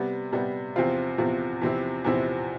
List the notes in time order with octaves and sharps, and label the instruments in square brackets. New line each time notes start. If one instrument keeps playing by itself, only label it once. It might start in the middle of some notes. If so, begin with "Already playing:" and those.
Already playing: [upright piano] C3 G3 B3
C3 G3 B3
E2 C3 F3 C4 F4
E2 C3 F3 C4 F4
E2 C3 F3 C4 E4
E2 C3 F3 C4 E4